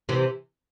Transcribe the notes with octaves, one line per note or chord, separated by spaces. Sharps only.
C3 E3